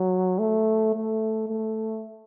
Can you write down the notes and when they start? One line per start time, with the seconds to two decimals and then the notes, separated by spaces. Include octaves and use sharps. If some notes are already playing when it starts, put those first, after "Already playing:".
Already playing: F#3
0.39 A3
0.94 A3
1.49 A3